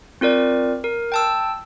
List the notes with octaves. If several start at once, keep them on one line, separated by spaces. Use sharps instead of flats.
C4 F4 A#4 D5
A#4
G5 A5 E6